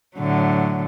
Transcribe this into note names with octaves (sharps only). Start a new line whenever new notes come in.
A2 D3 F#3